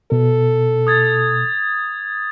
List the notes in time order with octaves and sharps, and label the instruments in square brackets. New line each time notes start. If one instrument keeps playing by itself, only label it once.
[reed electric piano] B2 [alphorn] A4
[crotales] D#6 G#6 A6